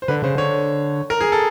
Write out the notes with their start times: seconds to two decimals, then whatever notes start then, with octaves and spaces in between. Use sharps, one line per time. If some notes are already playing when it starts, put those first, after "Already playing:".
0.02 C5
0.08 D3 B4
0.22 C#3 C5
0.36 D3 C#5
1.10 A#4
1.21 G#4
1.32 A4